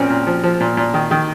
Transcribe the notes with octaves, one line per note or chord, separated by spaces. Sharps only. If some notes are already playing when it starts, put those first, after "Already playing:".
Already playing: A#2 F3 A#3 C4 C#4
A#2
F3
F3
A#2
A#2
D#3
D#3